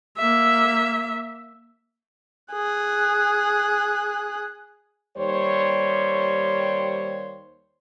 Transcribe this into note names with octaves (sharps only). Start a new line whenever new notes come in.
A#3 E5
G#4 F#6
D#2 G3 C5 C#5